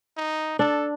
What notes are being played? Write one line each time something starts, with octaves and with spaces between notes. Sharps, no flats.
D#4
D4 A4